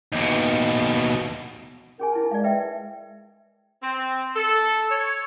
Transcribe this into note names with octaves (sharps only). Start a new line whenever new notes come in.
D#2 B2
C#4 G#4 A#4 G#5
D#4 E4 A5
G#3 D5 F5
B4 E5 G5
C4
A4
C#5